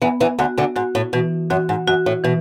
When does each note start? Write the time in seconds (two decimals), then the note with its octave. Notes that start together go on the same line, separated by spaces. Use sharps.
0.02 E2 E3 B3
0.20 E2 E3
0.39 D2 D3 F#4
0.58 D2 D3
0.76 G#2 F#4
0.95 A2
1.13 B2 E3
1.50 F#2 F#4
1.69 G#2
1.87 F#2 F#4
2.06 A2
2.24 B2 E3